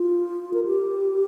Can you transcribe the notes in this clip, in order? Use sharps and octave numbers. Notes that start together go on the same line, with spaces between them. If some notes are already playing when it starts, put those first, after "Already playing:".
Already playing: F4
A#4
G4